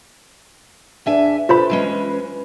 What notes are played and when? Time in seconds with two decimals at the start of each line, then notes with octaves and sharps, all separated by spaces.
1.06 E2 D4 E5 G#5
1.49 F4 A4 B4 C5 B5
1.70 E3 G#3 C#4